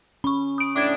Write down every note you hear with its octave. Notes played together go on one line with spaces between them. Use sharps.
C#4 B5 C#6
D#6 D7
A2 D4 D6 G#6